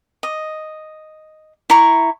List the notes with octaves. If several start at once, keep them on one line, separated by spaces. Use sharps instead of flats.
D#5
E4 A#5 C#6